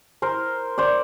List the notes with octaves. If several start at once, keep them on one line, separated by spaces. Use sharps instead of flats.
A#4 C5
C5 D5